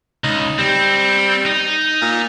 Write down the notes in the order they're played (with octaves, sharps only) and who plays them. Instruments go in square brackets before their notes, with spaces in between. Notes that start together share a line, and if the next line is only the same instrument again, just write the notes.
[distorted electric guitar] C#2 [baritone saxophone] D#4
[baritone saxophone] G3 [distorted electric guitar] C4
[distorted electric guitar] D#4
[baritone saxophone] A#2